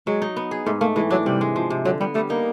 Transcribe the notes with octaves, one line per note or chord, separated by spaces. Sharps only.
F#3 G#3
D#4
B3
G#4
G#2 A3
A3 A#3
E3 G#3
F#3 D4
C3 G3
G#3
F3
C3
D3 F#3
G3 B3
G3 A3
A#3 D#4